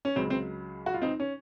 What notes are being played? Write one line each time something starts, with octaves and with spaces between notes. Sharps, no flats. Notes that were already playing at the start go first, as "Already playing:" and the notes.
C#4
C#2 C#3 F#3 C4
C4
F#4
F4
C4 D#4
C#4